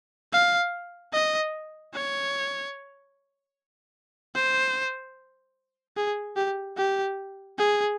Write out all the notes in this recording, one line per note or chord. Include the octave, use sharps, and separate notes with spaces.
F5
D#5
C#5
C5
G#4
G4
G4
G#4